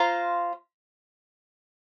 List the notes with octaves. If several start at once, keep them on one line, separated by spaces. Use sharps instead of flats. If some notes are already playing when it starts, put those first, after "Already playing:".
Already playing: F4 C5 F5 A#5